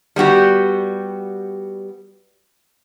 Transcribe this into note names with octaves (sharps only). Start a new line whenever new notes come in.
G3 B3 F#4 G4